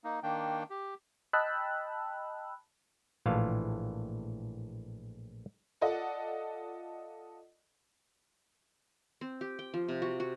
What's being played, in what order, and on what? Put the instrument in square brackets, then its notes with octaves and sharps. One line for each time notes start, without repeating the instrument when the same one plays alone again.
[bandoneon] A#3 D#4
D#3 A#3 D4 G5
G4
[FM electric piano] D#5 G5 A5 B5 E6 F#6
[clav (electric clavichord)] A#1 A2 E3 F4 F5 A5
[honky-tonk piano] F4 A4 D5 D#5 F#5
[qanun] C4
G4
G5
F3
C3
F#4
F#4